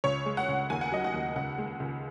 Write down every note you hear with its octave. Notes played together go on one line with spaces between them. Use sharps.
C#2 C#5
G#3
F#5
C#2
D#2 G#5
F#5
F#3 D#5
F#5
D#2
C#2 F#5
G#3
C#2